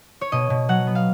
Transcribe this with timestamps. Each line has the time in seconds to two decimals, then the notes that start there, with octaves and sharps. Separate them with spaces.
0.21 C#5
0.32 B2 D#5
0.50 B2
0.69 F#3 F#5
0.87 B3
0.95 F5